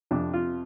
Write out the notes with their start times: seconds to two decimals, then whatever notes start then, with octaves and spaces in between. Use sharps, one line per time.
0.11 F2 C3 F3 D4
0.33 F4